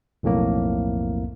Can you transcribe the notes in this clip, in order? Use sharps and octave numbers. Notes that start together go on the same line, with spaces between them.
B1 F2 A2 A#3